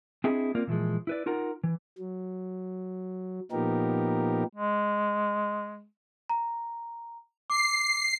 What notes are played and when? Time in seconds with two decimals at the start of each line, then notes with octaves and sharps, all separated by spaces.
0.24 C4 D4 E4 G#4 D#5
0.55 A#3 C4 F4 A#4 D5
0.67 A#2 E3 F3 G#3
1.07 E4 B4 D5
1.26 D#4 F4 A#4 F#5 A#5
1.64 E3
1.98 F#3
3.52 A#2 F3 B3 D#4 G4 A#4
4.55 G#3
6.30 A#5
7.50 D6 C7